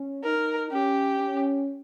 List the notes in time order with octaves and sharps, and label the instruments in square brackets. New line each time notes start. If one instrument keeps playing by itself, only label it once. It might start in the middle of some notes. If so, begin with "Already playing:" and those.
Already playing: [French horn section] C#4
[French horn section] D#4 [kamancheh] A#4
[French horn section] C#4 [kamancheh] G4
[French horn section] C#4